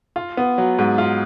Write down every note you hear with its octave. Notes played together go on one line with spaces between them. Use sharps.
F4
B3
F#3
G#2
F4